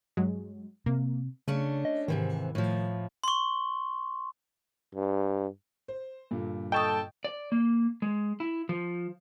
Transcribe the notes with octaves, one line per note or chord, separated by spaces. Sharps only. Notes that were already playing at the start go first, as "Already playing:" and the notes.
G2 F#3 G#3
C3 A#3
C#3 A3 C#4 D4
D#5
G#2 C3 D#3 E3
A2 F3
C6 C#6
G2
C5
G2 A#2 D3
A4 D#5 G5 A5 C#6 D#6
D5
A#3
G#3
E4
F3